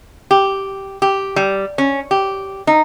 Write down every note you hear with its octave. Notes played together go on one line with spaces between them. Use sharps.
G4
G4
G3
C#4
G4
D#4